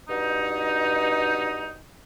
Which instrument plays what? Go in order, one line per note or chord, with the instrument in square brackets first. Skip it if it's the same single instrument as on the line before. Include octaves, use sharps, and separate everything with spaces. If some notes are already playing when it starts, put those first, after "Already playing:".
[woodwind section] G2 B2 D#4